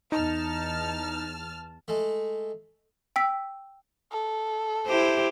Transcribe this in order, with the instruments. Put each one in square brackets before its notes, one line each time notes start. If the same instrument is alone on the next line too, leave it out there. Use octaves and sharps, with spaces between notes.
[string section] E2 A5 F6 [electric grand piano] D#4
[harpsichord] G#3 A3
[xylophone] G5 E6 B6
[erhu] A4
[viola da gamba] E4 G4 C5